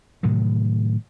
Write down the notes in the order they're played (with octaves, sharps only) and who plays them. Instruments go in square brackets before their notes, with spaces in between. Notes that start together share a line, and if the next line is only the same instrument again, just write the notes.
[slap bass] A2 C3 D#3 F#3